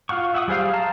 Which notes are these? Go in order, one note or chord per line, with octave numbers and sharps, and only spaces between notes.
F4 F5 F#5 C#6
E5 F#5 C#6 D#6
G3 G#4 C5 F5
F5 A5 A#5 C6